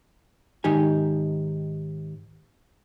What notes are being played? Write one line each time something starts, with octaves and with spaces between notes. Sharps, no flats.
G#2 D#3 D#4 G4 G#5